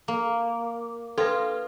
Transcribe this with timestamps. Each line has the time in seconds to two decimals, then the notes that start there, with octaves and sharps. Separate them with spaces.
0.08 A#3
1.18 F4 A4 B4